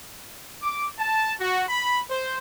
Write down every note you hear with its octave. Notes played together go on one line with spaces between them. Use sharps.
D6
A5
F#4
B5
C5